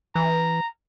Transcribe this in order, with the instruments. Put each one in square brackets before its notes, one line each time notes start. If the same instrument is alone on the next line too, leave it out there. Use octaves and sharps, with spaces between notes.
[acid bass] E3 [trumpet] A#5